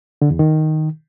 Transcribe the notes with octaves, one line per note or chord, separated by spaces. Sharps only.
D3
E2
D#3